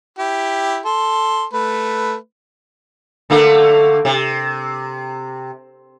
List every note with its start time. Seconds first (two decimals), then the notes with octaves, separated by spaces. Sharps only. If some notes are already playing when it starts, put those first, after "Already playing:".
0.19 E4 G4
0.85 A4 C6
1.53 A3 B4
3.30 D3 A3 A#3
4.05 C3